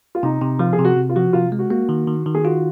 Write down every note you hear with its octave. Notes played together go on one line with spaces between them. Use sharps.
F4
C3 D#4
C3
F3 F4
G#4
C3
F#4
C3
F4
F3 F#4
C3 F4
G#3
F#4
A#3 F#4
D#3
D#3
D#3
G#4
F4 F#4